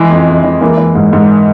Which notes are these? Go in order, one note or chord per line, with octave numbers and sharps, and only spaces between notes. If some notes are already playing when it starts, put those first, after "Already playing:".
Already playing: E3 G#3
F2
F2
E3
E3 A#3
E3
G#2
G#2